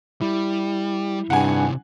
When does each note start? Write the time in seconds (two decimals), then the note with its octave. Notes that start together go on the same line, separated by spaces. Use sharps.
0.21 G3 E4
1.30 G2 C3 D#3 F#5 G#5